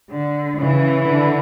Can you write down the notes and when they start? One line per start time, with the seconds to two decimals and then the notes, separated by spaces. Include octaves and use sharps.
0.10 D3
0.59 C#3 E3
1.07 D3